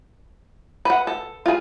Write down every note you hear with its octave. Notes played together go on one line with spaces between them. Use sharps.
B4 F#5
A4
F4 G#4